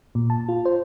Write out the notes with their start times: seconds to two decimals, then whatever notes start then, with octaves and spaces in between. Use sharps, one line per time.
0.15 A#2
0.30 A5
0.48 F4
0.65 C5